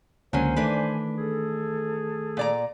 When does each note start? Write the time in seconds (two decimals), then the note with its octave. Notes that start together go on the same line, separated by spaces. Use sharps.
0.33 C#2 D3 F#3 A#3 C#4 C5 G#5
0.56 D#3 E3 A3 D4 B4
1.18 G#4 A4
2.37 A#2 D5 A#5